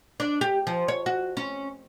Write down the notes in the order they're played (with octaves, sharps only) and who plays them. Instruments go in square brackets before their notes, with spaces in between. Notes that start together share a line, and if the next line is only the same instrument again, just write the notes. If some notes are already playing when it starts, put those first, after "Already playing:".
[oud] D4
G4
F3
C#5
F#4
C#4